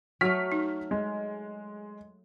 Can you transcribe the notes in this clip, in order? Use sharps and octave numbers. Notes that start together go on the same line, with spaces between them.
F#3 A3 C#6 F6 B6
D#4
G#3